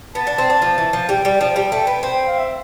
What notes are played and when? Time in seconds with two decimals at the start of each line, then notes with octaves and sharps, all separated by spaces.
0.15 B3 A5
0.27 D4
0.38 C4
0.50 D4
0.62 F3
0.78 E3
0.93 F3
1.09 G3 G5
1.25 G3
1.41 F3
1.56 G3
1.72 A3
1.87 B3
2.03 C4 G5
2.15 G5
2.26 F5
2.38 E5